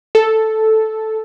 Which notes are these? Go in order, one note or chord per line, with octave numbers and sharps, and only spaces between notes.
A4